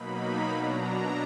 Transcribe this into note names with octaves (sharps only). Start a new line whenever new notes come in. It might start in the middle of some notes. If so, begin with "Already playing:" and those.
Already playing: B2 F#3 A#3 D#4 B5
B2 F#3 D4 A#5